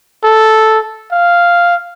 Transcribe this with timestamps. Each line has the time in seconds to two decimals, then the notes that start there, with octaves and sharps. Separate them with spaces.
0.24 A4
1.12 F5